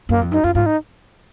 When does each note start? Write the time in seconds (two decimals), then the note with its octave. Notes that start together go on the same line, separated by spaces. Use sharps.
0.09 F#2 A#3
0.21 F2
0.31 F#2 D#4
0.44 F#2 F4
0.55 G#2 F4
0.66 D#4